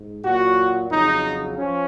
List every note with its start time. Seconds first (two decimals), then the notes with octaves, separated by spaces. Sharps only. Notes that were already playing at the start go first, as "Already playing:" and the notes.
Already playing: G#2
0.24 A#2 F#3 F#4
0.90 F2 C#3 F#3 D#4
1.57 F3 C#4